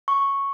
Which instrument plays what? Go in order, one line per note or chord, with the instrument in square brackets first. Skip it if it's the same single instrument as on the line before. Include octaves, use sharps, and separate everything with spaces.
[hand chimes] C#6